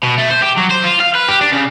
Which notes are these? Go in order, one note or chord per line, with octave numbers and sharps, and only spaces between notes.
B2
A3
C5
G4
F#3
C5
F4
F5
B4
G4
D4
C#3